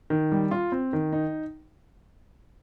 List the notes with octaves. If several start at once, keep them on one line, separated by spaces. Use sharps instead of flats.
D#3
G3
F4
C4
D#3
D#4